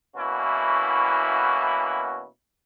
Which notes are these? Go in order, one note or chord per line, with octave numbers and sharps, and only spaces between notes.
B2 E3 A#3 C#4 E4 F#4